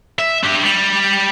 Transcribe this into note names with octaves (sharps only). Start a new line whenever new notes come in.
E5
D4 G4
G3